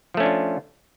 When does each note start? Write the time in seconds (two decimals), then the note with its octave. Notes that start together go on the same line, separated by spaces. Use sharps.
0.14 F3
0.17 A3
0.20 C#4
0.23 D4
0.26 F4